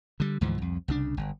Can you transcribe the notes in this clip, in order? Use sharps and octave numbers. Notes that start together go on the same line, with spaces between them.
D3 G3
D2 G#2 E3 F3
C2 F2
C2 C#3 D4
G1